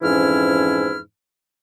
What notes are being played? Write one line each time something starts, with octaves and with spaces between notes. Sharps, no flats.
F2 G#2 E3 C#4 E4 F6